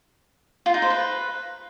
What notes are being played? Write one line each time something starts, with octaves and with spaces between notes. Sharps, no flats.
F4
D#4
C5
B4